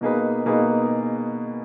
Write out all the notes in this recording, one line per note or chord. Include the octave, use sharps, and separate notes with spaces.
B2 A#3 D#4 G#4 B4
B2 A#3 D#4 G#4 B4